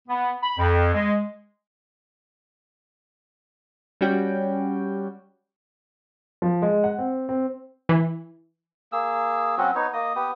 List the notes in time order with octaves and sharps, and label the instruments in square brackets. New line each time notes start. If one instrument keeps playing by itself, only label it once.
[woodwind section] B3
B5
F2
G#3
[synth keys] G3 C#4 F#4 G5
[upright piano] F3
G#3
F#5
C4
C4
[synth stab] E3
[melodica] A#3 G#4 E6
F#3 C4 C#4 F#4
B3 D#4 C#5
A#3 D#5 D#6
B3 G4 D#6